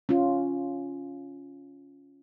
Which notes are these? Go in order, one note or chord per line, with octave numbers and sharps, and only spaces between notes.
C#4 F4